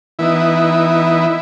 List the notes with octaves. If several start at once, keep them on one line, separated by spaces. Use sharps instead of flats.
E3 B3 D#4 E4